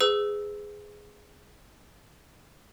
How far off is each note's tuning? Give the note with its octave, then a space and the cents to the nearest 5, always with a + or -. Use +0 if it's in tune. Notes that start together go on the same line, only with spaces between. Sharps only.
G#4 +0 B4 +40 E6 -5